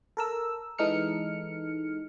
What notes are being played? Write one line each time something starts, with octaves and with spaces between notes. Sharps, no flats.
A4 A#4 E6
E3 G#3 D#4 A4 F6 C#7